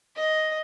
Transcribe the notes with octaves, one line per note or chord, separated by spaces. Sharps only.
D#5